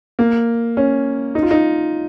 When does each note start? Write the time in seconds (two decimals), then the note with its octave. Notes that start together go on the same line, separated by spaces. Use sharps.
0.19 A#3
0.77 C#4
1.35 D#4
1.43 F4
1.51 D#4